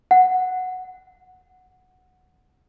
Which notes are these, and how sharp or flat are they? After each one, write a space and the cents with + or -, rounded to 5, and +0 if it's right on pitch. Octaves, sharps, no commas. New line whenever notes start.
F#5 -5